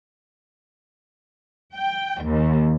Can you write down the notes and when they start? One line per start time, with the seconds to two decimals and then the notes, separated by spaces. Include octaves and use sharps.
1.76 G5
2.23 D#2